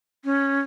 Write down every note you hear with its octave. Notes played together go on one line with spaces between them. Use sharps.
C#4